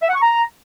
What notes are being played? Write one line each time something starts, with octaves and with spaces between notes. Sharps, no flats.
E5
F#5
C#6
A#5